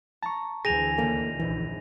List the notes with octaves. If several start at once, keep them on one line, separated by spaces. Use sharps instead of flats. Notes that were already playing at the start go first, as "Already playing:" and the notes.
A5 A#5 C#6
D2 E3 G#4 G5 G#5 A#6 D#7 F7
D#1 C#2 A#3 A4
F1 A#1 E3